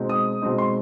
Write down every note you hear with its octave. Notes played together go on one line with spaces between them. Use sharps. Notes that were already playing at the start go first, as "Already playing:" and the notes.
Already playing: B2 G#3 C4 D#4
D#6
B2 G#3 C4 D#4
C6